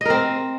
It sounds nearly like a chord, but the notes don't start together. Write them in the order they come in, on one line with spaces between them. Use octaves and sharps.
D#5 A#4 C4